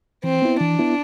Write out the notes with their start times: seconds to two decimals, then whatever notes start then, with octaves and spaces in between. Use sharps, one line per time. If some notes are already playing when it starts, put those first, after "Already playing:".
0.24 E3 C4
0.42 B3 E4
0.60 E3 D4
0.79 B3 E4